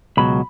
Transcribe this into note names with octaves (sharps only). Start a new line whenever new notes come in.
C#2 B2 F#3 B5